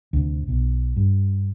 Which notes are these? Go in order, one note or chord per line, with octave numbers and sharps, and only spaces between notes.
D2 C3
B1
G2